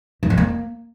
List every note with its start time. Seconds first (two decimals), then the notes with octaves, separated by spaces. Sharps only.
0.23 G2
0.30 F2
0.38 A#3